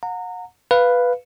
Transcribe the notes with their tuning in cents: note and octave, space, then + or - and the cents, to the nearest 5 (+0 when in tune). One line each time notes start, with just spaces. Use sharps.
F#5 -35 A#5 -25
B4 +0 F5 +0